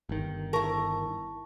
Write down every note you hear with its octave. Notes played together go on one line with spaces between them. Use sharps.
G1 D#3
E4 A#4 A5 C#6